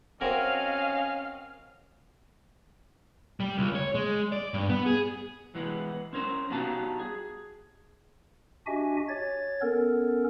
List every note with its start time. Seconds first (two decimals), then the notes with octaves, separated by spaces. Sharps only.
0.21 C4 C#4 F#4 A#4 D#5 F5 F6
3.40 G3
3.58 C#2
3.75 C#5
3.95 G#3
4.32 D5
4.54 G2
4.69 B3
4.86 G#4
5.55 E3 G#3 B3
6.13 C4 C#4 A#4 C5
6.50 G3 B3 D#4 F#4 F5 A5
7.00 G#4
8.67 D4 F#4 G4 D#5 E5 G#5
9.08 C#5 A6
9.61 B3 C#4 A4 A#4